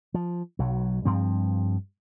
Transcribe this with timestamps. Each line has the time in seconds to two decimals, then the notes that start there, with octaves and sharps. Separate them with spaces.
0.14 F3
0.59 B1 F#3
1.05 G2 F3 C4